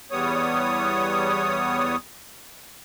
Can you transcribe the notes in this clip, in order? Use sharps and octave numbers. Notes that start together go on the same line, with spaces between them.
E2 G3 B3 C#5 D#6